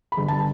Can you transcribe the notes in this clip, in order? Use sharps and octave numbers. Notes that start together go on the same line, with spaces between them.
B5
G1
A5